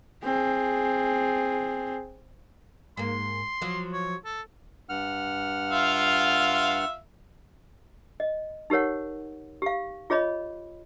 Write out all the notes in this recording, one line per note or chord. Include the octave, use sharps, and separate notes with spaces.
C4 G#4
G#2 A#3 C6
F3 F#3
C#5
A4
G2 F#5 F6
F4 E5 F5
D#5
D#4 G4 A#4 C#5 F#5
G4 F5
F4 G#4 C#5 D#5 B5